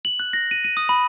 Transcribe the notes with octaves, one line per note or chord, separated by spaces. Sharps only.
F#7
F#6
A#6
D#7
D#7
D#6
B5